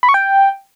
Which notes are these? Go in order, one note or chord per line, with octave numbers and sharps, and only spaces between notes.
B5
C#6
G5